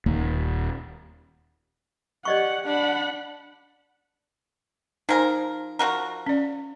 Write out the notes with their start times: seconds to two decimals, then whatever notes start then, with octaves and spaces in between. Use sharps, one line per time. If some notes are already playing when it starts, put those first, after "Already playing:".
0.06 D#1 D#2 A#3
2.25 G4 D5 D#5 F#5 C#6
2.66 D4 F#5 B5
5.09 F3 D#4 A#4 C5 G#5
5.79 F3 F#4 A#4
6.26 C#4 D5